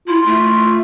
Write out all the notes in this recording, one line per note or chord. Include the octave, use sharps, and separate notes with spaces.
E4 F4
A3